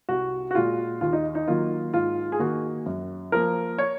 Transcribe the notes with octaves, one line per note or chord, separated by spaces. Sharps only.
C2 F#4
F#4
A#2 G#3 F4
D#2 F4
D#4
D#4
D#3 F#3 A#3 F4
G#2 F4
G#4
D#3 A#3 F#4
F#2
F3 A#3 A#4
C#5